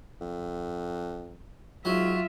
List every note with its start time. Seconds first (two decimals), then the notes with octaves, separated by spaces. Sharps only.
0.21 F2
1.85 G#2 F#3 F4 E5